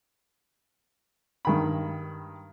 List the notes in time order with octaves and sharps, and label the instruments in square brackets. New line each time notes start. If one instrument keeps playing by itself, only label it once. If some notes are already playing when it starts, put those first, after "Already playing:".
[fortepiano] G2 D#3 B5